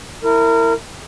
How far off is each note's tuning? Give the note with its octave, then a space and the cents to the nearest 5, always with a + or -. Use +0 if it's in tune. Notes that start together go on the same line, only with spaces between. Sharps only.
E4 +0 A#4 -25